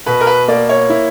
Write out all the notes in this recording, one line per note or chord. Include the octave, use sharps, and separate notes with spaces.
B2 B4
A#4
B4
A#3 D5
C#5
E4